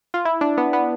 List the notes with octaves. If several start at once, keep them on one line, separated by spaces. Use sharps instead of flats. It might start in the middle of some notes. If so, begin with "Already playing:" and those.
F4
E4
D4
B3
B3